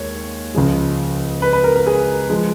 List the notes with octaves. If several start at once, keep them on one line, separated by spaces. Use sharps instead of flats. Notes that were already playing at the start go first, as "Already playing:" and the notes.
Already playing: D#2 G#3 C#5
C#2 C#3 F3 G#3
B4
B4
A#4
A#4
G#4
F3 G#3